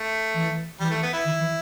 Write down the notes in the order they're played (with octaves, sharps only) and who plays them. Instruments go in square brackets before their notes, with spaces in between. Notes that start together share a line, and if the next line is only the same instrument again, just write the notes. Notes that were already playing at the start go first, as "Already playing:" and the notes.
Already playing: [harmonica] A3
[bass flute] E3
[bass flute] E3 [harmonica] G3
[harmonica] A3
B3
E4
[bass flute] D#3
E3